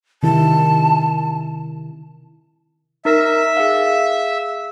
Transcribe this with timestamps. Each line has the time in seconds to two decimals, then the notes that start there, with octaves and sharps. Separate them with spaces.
0.23 C3 D#3 E4 A5
3.05 D#4 A#4 E5 A#6
3.57 G#4 F5